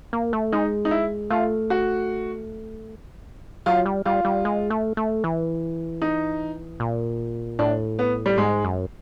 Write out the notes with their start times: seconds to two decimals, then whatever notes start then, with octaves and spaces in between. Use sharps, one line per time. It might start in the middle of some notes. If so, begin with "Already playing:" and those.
0.13 A#3
0.33 A3
0.52 G#3 D#4
0.85 D#4
0.91 E4
1.30 A3 F4
1.70 F#4
3.66 F#3 F4
3.86 G3
4.05 G3 F4
4.25 G3
4.45 G#3
4.70 A3
4.97 A3
5.24 E3
6.02 D#4
6.80 A#2
7.59 A2 D4
7.99 B3
8.26 G3
8.38 G#2 G#3
8.64 F#2